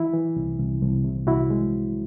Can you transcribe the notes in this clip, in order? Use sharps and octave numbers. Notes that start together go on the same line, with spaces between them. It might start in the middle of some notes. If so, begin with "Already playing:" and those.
Already playing: E3 E4
E3
C2
C2
C2
C3
C2 E4 F#4
G#3